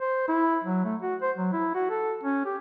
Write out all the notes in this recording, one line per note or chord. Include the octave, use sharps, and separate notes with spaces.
C5
E4
F#3
A3
F#4
C5
F#3
E4
F#4
A4
C#4
G4